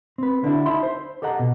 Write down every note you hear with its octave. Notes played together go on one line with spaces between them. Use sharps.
C4 B4
D3 D4 E4 F#4
D#4 E5 A5 B5 C6
C5
G4 A4 D#5 F#5 A#5
B2